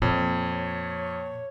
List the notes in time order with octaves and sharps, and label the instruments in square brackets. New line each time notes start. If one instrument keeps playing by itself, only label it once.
[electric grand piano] F2 [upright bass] A#2 A#3 [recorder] C#5